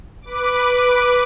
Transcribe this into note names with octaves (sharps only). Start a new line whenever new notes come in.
B4 D6